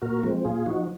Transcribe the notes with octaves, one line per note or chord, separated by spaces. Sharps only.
A#2 F#4 A#4
A#3
F3 G#3 C4
A#2 F4 G#4
F3 D#4 F#4